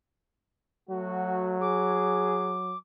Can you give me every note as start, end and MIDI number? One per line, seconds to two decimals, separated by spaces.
0.90 2.75 54
0.90 1.56 57
0.90 1.56 66
1.61 2.54 68
1.61 2.77 86